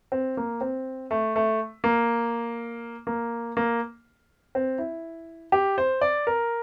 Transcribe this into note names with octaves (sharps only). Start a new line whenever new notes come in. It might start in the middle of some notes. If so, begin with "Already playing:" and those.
C4
A#3
C4
A3
A3
A#3
A#3
A#3
C4
E4
G4
C5
D5
A#4